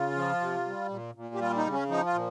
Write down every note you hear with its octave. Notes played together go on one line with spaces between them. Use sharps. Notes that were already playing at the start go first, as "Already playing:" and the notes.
Already playing: C#3 F4
F3
C3
G3
A#2
A#2
G4
G3 F4
D#4
C#3
C#4
F3 D#4
F4
A#2